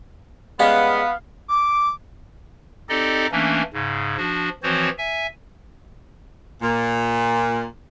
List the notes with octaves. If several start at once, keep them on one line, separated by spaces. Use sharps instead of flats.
G3 G#3 B3 C#4 F5
D6
C4 D#4 G4 A4 D5 D#5
E3 A3 A#3 C#4 D4
G#2 C#3
F3 D4 F#4
E3 F3 C4 F#4 C5 C#5
E5 G#5
A#2